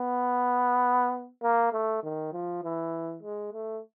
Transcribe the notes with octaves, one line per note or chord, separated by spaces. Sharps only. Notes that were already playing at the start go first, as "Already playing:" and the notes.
Already playing: B3
A#3
A3
D#3
F3
E3
G#3
A3